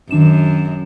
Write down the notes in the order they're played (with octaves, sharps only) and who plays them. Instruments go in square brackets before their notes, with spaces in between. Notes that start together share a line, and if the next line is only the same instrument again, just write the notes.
[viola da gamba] F#2 [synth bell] D#3 D4 E7